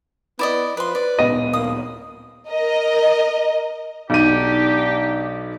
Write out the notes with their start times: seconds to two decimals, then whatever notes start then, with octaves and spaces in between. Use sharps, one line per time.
0.39 B3 E4 D5 D#5
0.77 F3 B4 C6
0.95 B4 D5
1.19 D1 A#2 B3 D#5
1.53 A#3 D#6
2.49 A#4 D#5
4.10 B1 D4 D#4 G4 D#7